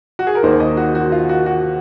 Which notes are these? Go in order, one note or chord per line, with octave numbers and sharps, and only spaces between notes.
F#4
G#4
A#4
D#2 D#3 A#3 D#4 C5
D#5
F#4
F#4
F4
F#4
F#4